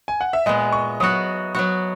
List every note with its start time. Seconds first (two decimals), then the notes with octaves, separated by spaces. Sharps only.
0.08 G#5
0.21 F#5
0.33 E5
0.46 A#2 G#3 B3 D#5
0.72 C#6
1.00 F#3 B3 F#4 D#6
1.55 F#3 B3 F#4